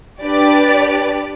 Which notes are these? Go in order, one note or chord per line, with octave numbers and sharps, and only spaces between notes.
D4 G4 B4 D5